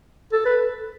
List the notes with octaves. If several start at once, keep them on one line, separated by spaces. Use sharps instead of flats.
A4
B4